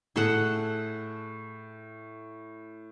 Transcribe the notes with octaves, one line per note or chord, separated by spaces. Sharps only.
A2 G#4 A4 F#5